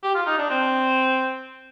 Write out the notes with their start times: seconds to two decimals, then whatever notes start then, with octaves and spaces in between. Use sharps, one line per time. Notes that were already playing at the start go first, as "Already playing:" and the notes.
0.03 G4
0.15 F4
0.26 D#4
0.38 D4
0.50 C4